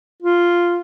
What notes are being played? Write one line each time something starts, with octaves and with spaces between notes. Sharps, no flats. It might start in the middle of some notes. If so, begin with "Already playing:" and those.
F4